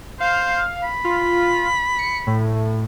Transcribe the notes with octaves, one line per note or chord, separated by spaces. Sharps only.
C5 F5
B5
F4
C#7
A2